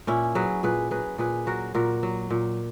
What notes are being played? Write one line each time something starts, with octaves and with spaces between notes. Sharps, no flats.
A#2 C#4 E4
F#3 G#4 B4
A#2 G#4 B4
F#3 G#4 B4
A#2 G#4 B4
F#3 F#4 A#4
A#2 F#4 A#4
F#3
A#2